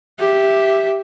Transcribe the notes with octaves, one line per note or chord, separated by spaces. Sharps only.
G4 E5